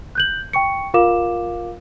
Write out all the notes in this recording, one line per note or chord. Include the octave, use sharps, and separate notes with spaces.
F#6 G6 F#7
G5 C#6 C#7
F4 A#4 F5 D6 E7